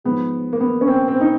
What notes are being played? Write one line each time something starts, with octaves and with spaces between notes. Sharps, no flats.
G#2 F3 G#3 B3
A#3
B3
C#4
C4
C4
D#4